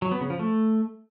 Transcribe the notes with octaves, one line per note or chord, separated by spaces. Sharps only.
F#3
B3
C#3
F3
A3